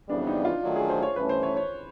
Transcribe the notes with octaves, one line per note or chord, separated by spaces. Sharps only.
F2 C#3 E3 G3 B3 D4
D#4
F4
D#3 F#3 A3 D4 F4
G#4
C5
C#5
G2 E3 A3 C#4 B4
C5
C#5
C#5